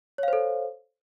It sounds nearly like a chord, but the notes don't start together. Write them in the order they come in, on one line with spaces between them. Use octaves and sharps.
C#5 F5 C5 A4